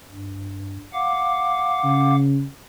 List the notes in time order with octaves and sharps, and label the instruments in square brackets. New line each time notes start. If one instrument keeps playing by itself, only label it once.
[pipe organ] G2
F5 F#5 D6
[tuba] C#3